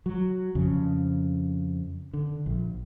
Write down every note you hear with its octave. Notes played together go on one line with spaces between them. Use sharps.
F#3
F2 C#3
D3
A#1